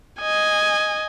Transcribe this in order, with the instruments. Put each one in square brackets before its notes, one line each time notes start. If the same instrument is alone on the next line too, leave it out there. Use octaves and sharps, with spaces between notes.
[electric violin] D#5 G#5